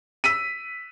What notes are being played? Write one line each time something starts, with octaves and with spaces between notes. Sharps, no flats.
E6 B6 D#7